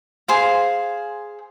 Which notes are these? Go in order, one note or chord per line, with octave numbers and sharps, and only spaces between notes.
G#4 C5 F5